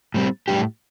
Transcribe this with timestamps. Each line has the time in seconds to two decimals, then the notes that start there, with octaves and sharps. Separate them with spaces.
0.14 A2 G3 C4
0.48 A2 G3 D4 G4